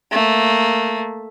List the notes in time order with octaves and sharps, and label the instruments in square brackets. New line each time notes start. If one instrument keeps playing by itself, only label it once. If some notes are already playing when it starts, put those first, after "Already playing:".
[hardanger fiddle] A3 A#3